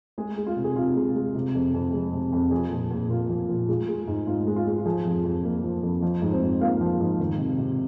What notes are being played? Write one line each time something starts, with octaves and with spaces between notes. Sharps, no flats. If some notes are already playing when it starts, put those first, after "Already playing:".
G#3 G#4
G#3
F4
C3
G#4
C3 F4
G#3
G#3
C3
F2
F2
G#3
C3
F2
F3 G#4
A#2
A#2
A#3 F4
F3
A#2
G#3 F4
G#3
G#2
G#2 F4
G#3
F4
G#3
F4
F3 G#4
F2
F2
A#3
F3
F2
F3
G#2
C4 C5
G#2
A#3 F4 F5
F3
G#2
D#3
C3
C3